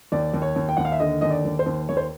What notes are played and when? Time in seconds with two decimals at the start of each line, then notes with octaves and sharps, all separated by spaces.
0.12 D#2 D5
0.34 D#2
0.42 C#5
0.56 D#2
0.69 G5
0.77 D#2 F#5
0.85 F5
0.92 E5
1.00 D3 D#5
1.21 D#2 D#5
1.30 D5
1.45 D#2
1.59 C5
1.66 D#2
1.89 D#2 C#5
1.97 C5